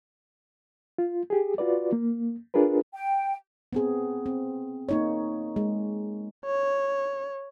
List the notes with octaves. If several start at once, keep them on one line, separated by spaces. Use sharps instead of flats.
F4
G4 G#4
F4 F#4 B4 D5
A#3
D4 F4 G#4 A#4 B4
G5
B3 C4 G#4
C4
A#3 D#4 C#5
G#3
C#5